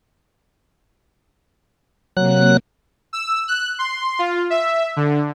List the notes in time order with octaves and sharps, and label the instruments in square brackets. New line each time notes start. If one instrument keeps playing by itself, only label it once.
[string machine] C3 A#3 [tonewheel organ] F#3 F#6
[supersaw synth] E6
F#6
C6
F4
E5
D3